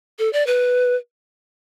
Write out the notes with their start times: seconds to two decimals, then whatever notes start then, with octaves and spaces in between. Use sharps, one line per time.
0.19 A4
0.33 D5
0.47 B4